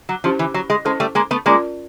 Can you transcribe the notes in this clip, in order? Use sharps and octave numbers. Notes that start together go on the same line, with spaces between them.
F#3
F3 C#4 E4 G4 C5
E3
F#3
G#3
G#3 C#4 E4 A4 C5
G3 A3
G#3 A#3
A3 B3
G#3 A#3 C#4 F4 A#4 D5